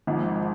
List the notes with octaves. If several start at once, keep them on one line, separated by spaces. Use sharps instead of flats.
G#1 G#2 F3